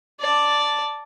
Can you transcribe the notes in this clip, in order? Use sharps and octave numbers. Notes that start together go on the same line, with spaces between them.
D5 A5